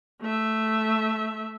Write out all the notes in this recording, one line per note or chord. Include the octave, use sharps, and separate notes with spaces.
A3 E5